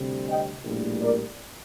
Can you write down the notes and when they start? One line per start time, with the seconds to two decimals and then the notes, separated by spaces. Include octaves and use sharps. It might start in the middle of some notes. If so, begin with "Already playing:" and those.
Already playing: D2 C3 G3 C4
0.27 D#5 G5
0.64 A#1 A2 G3 A#3
1.00 A#4 D5